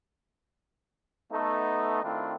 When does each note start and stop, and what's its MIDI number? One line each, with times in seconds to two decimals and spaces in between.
1.31 2.02 57
1.31 2.02 59
1.31 2.02 63
2.03 2.35 51
2.03 2.35 57
2.03 2.35 60
2.03 2.35 62
2.03 2.35 64
2.03 2.35 65